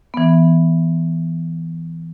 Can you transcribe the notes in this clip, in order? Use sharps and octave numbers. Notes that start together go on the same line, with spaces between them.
E3 B3